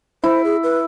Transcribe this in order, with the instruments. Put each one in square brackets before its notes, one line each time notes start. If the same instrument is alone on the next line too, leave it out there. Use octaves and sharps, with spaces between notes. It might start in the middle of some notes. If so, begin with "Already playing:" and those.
[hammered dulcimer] E4 [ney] C5
[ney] G#4
B4